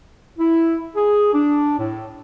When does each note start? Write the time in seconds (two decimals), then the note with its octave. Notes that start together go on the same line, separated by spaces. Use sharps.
0.39 E4
0.95 G#4
1.33 D4
1.79 A2